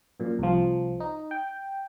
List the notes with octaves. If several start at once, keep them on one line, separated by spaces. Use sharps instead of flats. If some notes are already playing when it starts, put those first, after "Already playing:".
F#2 A#2
C2 F3
D#4
G5